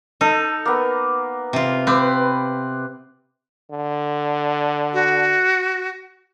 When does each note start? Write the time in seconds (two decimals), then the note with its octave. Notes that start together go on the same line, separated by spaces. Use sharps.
0.21 D#4 A4
0.65 A#3 B3
1.53 C3 F4
1.87 C4 B4 D6
3.71 D3
4.93 F#4